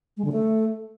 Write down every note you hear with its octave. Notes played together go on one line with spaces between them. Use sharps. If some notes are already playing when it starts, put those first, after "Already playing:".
G#3
D3
A3